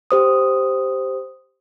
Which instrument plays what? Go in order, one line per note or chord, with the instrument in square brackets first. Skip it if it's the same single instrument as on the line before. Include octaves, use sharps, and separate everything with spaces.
[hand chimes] G4 C5 D#6